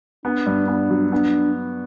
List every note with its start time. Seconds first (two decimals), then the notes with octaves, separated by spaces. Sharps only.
0.25 B3 D4
0.46 G2
0.68 B3 D4
0.90 F#3
1.12 B3 D4